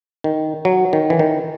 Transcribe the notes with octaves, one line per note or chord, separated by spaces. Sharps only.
D#3
F#3
D#3
E3
D#3